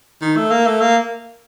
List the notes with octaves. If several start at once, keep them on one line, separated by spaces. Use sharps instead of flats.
D#3
A3
A#3
A3
A#3